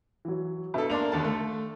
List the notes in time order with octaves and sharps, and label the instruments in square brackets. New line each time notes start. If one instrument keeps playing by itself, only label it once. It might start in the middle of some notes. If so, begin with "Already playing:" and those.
[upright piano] E3 F#3
[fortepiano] B2 A4 [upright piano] D4 E5
[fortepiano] A#3 D4 [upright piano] C6 F7
[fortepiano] D#2 D3 A5
A3